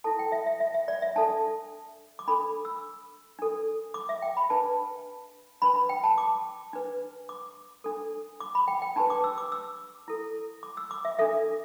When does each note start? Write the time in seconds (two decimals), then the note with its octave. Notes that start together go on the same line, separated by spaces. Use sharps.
0.04 E4 A4 A5
0.19 G5
0.32 E5
0.46 E5
0.60 E5
0.74 E5
0.88 D5
1.02 E5
1.16 D4 A4 A5
2.19 D6
2.27 D4 A4 B5
2.65 E6
3.39 D4 A4
3.94 D6
4.09 E5
4.22 G5
4.37 B5
4.50 D4 B4 A5
5.62 D4 B4 B5
5.76 B5
5.89 G5
6.04 A5
6.18 D6
6.73 D4 B4
7.29 D6
7.84 D4 A4
8.40 D6
8.55 B5
8.68 G5
8.82 G5
8.96 D4 G4 B4 A5
9.10 D6
9.24 E6
9.38 D6
9.52 E6
10.08 E4 A4
10.63 D6
10.77 E6
10.91 D6
11.05 E5
11.19 D4 A4 E5